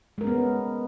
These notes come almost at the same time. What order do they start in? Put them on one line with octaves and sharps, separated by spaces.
G#3 A#4 C#4 B3